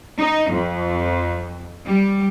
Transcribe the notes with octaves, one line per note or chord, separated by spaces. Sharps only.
D#4
F2
G3